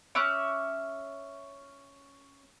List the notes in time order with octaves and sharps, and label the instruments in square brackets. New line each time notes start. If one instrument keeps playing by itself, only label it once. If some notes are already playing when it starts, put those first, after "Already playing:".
[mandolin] C#4 E5 D6 F#6